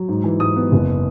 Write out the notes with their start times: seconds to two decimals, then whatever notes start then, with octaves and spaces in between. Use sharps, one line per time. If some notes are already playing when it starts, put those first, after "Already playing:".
Already playing: F#3
0.08 G#2
0.24 E3
0.40 G#2 D#6
0.56 B3
0.72 F#1